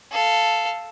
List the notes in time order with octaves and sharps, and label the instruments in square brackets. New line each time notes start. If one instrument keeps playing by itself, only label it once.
[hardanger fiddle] A4 F5